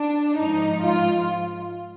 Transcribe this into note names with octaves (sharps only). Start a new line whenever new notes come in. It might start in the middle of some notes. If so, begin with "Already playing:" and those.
Already playing: D4
G#2 F3 D#4
F4